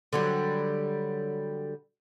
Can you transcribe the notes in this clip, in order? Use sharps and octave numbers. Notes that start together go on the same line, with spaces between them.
D3 F#3 G3